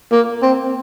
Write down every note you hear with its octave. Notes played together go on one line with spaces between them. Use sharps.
A#3
C4